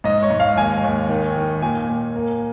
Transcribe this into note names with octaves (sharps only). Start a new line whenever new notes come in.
G#2 D#5
C#5
G#2
F5
D#2 G#5
D#2
D#3
D#3
A#2 G#5
A#2
A#3